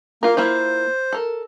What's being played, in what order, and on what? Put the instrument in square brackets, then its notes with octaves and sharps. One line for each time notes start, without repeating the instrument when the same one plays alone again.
[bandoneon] A#3 [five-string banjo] F4 A#4
[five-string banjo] A#3 E4 F4 [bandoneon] C5
[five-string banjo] A4 A#4